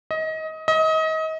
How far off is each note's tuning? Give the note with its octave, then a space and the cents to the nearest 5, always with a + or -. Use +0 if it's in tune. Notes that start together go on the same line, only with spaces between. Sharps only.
D#5 +25
D#5 +30